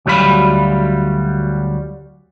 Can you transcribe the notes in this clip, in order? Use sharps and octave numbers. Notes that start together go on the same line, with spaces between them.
D2 F#3 G3 F4 B5